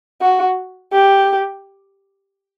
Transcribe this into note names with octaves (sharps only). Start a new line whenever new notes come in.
F#4
G4